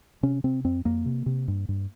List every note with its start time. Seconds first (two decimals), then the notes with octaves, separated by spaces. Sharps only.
0.23 C3 C#4
0.44 C3 C4
0.65 F2 C4
0.85 F2 A#3
1.06 C3
1.26 C3
1.48 G2
1.69 G2